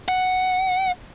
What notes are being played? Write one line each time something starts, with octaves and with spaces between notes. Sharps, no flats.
F#5